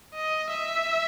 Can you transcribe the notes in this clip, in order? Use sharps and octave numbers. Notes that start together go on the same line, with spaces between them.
D#5
E5